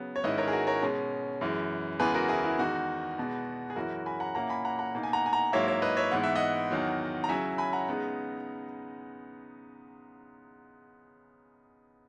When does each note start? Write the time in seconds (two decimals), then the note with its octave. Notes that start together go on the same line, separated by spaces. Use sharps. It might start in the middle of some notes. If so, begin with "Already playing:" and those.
Already playing: C#3 F#3 B3
0.16 C#5
0.24 G#2 D#3 G#3 C#4 E4 B4 D#5
0.38 A#4 C#5
0.48 G#4
0.53 F#4 A#4
0.67 A#4 C#5
0.82 B2 G#3 C#4
1.41 F#2 E3 G#3
2.00 E2 C#3 E3 G#3 B3 G#4 B4
2.14 F#4 A#4
2.29 E4 G#4
2.44 E4
2.58 E2 D#3 G#3 D#4 F#4
3.18 E2 B2 G#3 B3
3.70 G#4
3.76 F#2 E3 G#3 C#4 E4 F#4 A#4
4.06 G#5 B5
4.20 F#5 A#5
4.35 A#2 A#3 C#4 E4 F#5 A#5
4.49 G#5 B5
4.65 F#5 A#5
4.79 F#5 A#5
4.94 B2 A#3 D#4
5.03 G#5
5.13 F#5 A#5
5.26 G#5
5.33 F#5 A#5
5.52 G#2 F#3 A#3 E4 C#5 E5
5.67 C#5 E5
5.82 B4 D#5
5.97 C#5 E5
6.11 G#2 E3 B3 E4 F#5
6.24 E5
6.35 D#5 F#5
6.70 E2 D#3 F#3
7.24 A#5
7.29 C#3 F#3 C#4 E4 E5 G#5
7.58 G#5 B5
7.73 F#5 A#5
7.88 C#3 G#3 B3 D#4